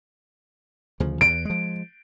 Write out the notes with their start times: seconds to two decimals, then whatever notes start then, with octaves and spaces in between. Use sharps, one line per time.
1.00 D2 C#3 F3
1.21 E2 D7
1.45 F3 G#3